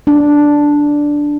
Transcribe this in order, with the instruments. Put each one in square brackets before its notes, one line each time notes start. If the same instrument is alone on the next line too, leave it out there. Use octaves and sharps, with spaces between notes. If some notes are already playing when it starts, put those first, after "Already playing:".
[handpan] D4